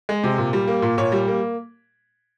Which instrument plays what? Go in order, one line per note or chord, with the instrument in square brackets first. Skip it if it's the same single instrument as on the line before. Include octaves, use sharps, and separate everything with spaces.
[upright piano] G#3
C3
A#2
G3
A#3
A#2
A#2 C#5
G3
A#3